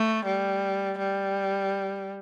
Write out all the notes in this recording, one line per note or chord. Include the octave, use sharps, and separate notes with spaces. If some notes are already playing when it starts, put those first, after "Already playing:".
Already playing: A3
G3
G3